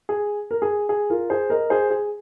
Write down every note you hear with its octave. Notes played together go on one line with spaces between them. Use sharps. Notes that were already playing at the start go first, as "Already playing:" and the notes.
G#4
A#4
G#4
G#4
F4 A#4
G#4 C5
A#4 D#5
G#4 C5
G#4